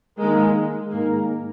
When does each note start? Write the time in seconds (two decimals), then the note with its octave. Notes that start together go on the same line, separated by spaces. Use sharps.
0.19 D#3 G#3 A#3 D#4 A#4
0.91 G#2 D#3 G#3 A#3 D#4 A#4